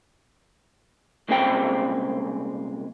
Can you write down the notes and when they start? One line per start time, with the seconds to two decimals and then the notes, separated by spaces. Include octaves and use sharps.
1.29 C2 A#2 C#3 G#3 C4 G5